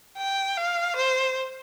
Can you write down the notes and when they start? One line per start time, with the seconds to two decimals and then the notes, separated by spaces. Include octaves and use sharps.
0.18 G5
0.57 F5
0.96 C5